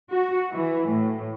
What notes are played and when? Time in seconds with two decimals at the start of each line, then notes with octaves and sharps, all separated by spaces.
0.11 F#4
0.51 E3
0.88 A2